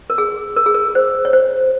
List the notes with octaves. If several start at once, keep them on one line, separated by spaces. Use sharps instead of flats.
A#4
G#4
A#4
G#4
A#4
C5
C#5
C5